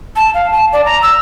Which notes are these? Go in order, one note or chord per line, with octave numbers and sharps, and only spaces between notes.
A5
F5
A5
D5
A#5
E6